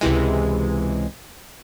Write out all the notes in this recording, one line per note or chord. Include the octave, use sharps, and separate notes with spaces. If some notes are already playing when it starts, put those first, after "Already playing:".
C#2 C3 E3 G#3